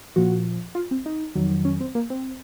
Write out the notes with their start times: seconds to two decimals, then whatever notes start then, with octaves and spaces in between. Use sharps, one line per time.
0.16 A#2 F3 F#4
0.75 F4
0.91 C4
1.06 D#4
1.35 F2 D#3 F#3
1.65 C#4
1.80 C4
1.95 A#3
2.10 C4